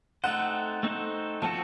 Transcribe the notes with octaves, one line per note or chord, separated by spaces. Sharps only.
A3 C4 D#4 A4 C5 F#5
A3 C4 D#4 A4 C5
F3 A3 C4 F#4 A4 A5